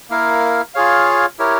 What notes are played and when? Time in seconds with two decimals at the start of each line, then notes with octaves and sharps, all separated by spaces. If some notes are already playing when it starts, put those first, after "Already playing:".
0.10 A#3 E4 A#4 F5
0.74 F4 G#4 C#5 F5
1.39 E4 G4 A#4 C#5